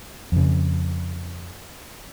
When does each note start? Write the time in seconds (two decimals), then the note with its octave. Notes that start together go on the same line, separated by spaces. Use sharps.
0.32 F2 C#3